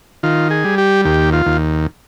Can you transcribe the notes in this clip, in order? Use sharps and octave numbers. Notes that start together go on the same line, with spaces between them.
D#3 F4
G#4
G3
G4
D#2 G4
F4
D#2